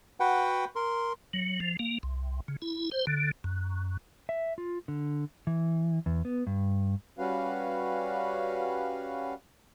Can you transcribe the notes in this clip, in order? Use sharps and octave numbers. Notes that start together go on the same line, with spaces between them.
F#4 B4 F#5 G5
A#4 C6
F#3
F3
A#3
C2
C#3
E4
C5
D3
F#2
E5
F4
D3
E3
E2
B3
G2
G3 C#4 F#4 B4 F5